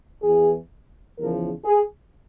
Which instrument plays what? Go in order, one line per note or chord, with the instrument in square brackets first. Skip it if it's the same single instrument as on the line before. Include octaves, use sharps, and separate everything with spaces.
[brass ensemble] E2 E3 G#4
E2 C#3 F3 A#4
G#4